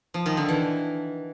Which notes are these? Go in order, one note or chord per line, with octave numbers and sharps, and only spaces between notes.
F3
D#3
D3
E3